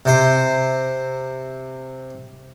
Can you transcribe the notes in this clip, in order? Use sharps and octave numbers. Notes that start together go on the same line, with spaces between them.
C3 C5